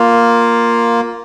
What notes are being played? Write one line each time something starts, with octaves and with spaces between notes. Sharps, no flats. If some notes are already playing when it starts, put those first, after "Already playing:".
Already playing: A#3 F4